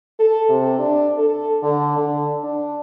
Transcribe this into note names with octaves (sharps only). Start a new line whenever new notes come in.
A4
C3
D4
A4
D3
D3
D4